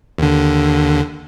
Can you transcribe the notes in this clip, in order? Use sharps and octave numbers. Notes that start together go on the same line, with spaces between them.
D#2 D3